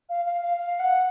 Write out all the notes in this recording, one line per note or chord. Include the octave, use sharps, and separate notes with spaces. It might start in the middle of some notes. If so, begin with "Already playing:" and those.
F5
F5
F5
F5
F#5